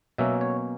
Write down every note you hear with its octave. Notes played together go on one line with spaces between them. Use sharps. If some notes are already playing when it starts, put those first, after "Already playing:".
B2 F#3 A#3 C#4 E5
C#5